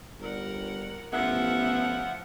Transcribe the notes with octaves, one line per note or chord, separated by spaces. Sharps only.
G1 G3 A#4 F#5
A1 F3 B3 E5 F#5